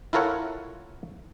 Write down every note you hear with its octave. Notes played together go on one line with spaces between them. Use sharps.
E4 F4 A4 A#4 C#5 F#5